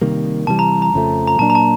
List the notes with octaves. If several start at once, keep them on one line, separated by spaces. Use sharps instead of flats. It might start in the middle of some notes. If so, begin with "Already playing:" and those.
C3 D#3 G3 A#3
C3 E3 G3 A5
A#5
A#5
F2 C#3 F3 A3
A#5
A#2 F#3 A#3 D4 A5
A#5
A5